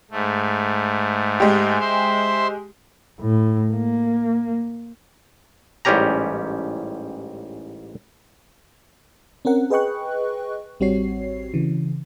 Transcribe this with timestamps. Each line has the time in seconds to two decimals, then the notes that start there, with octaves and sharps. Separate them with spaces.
0.11 G#2 A3
1.40 G#3 G4
1.80 C5 E5 C6
3.21 A2
3.73 A#3
5.85 A1 G#2 G3 C#4 G4 A#5
9.45 C4 C#4 A#4 F#5
9.70 G#4 B4 D#5 G5 C#6 F#6
10.80 A1 G3 C4 F#4 C#5 C7
11.54 C#3 E3